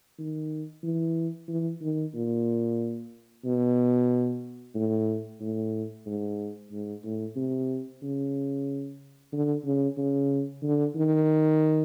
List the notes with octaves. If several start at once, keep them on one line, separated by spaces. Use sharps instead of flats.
D#3
E3
E3
D#3
A#2
B2
A2
A2
G#2
G#2
A2
C3
C#3
D3
C#3
C#3
D3
D#3